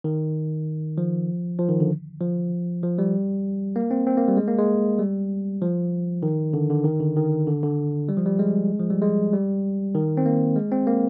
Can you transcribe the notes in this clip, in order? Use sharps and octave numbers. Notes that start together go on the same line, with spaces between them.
D#3
F3
F3
D#3
D3
F3
F3
G3
A#3
C4
C4
A#3
G3
G#3
A#3
G#3
G3
F3
D#3
D3
D3
D#3
D3
D#3
D3
D3
G3
F3
G3
G#3
F3
G3
G#3
G3
D#3
C4
A#3
G#3
C4
A#3